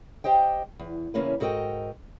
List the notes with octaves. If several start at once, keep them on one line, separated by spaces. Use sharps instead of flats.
G4 C5 D#5 G5
E2
E2 C#3 A#3 C#4 E4 B4
G#2 F#4 A4 A#4 D#5 G5